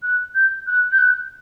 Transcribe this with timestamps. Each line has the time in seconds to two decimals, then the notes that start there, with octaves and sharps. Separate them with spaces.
0.03 F#6
0.35 G6
0.67 F#6
0.92 G6
0.98 F#6